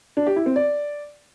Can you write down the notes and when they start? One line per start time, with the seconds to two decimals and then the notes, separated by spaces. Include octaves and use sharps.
0.17 D4
0.27 G4
0.36 E4
0.46 C4
0.56 D5